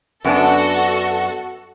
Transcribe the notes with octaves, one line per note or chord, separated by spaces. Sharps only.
F#2 B3 D4 F#4 A4